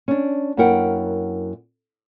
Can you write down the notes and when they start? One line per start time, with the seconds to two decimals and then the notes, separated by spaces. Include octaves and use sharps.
0.08 C#4 D4
0.57 F#2 A#3 E4 A#4 F#5 G5